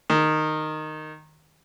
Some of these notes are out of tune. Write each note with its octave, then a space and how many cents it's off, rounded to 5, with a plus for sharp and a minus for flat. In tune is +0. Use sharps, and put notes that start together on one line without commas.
D#3 -10